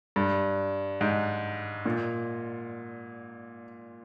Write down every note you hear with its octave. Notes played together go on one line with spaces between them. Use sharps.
G2
G#2
A#2